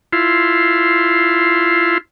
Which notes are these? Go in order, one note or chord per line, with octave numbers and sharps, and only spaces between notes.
E4 F4 C6